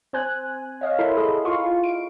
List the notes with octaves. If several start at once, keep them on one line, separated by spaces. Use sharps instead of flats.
C4 C5 G#5 F#6
C#5 D#5 F5
E4 A4 A#4 B5 C6
G#4 A4 D#5
F4 F5 C6 C#6
D7